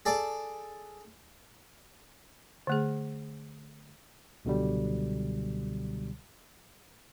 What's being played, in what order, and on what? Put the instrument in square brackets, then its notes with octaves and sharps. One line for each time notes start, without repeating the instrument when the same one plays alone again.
[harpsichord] G#4 A4 D5 D6
[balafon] D3 A3 G#4
[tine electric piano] C#2 B2 D3 F#3 G3